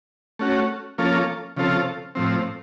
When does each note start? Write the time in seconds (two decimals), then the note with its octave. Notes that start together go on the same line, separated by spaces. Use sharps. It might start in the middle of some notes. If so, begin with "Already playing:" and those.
0.39 A3 C#4 F#4
0.98 F3 A#3 C#4 F4 A4
1.57 C#3 F3 C4 F4 A4
2.15 A2 F3 C4